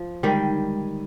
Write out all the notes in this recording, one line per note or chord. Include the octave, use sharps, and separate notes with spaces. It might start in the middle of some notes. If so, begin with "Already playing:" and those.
Already playing: F3
D3 D#3 G3 G#3 D#4